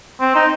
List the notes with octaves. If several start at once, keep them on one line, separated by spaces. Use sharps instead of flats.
C4
D#4